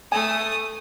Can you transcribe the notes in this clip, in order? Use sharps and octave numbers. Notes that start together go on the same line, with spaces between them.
A3 G#5 D#6